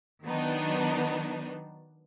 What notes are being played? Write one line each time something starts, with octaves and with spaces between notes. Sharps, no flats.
D#3 F#3 B3 D4 D#4